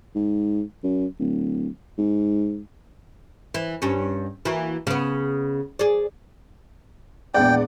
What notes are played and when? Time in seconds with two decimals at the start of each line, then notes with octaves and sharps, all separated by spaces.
0.15 G#2
0.83 F#2
1.19 D1
1.98 G#2
3.54 E3
3.82 G2 C#4
4.45 E3 A#3 F#4
4.87 C#3 B3
5.79 G#4 D5
7.34 A#1 E2 G#3 D5 F#5 G5